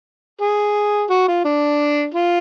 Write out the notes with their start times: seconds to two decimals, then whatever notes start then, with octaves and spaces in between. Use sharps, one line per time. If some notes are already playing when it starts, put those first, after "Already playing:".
0.41 G#4
1.10 F#4
1.28 F4
1.45 D4
2.14 F4